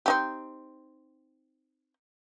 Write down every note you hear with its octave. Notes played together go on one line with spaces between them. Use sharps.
C4 D#4 G4